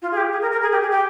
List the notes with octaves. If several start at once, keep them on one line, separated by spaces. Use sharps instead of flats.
F4
G#4
G4
G#4
A#4
A#4
G#4
G4
G#4
G4